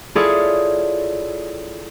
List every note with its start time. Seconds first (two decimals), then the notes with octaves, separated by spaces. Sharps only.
0.15 E4 F4 G#4 A4 C#5 D5